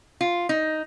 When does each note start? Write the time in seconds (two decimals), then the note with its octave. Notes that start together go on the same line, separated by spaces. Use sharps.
0.21 F4
0.49 D#4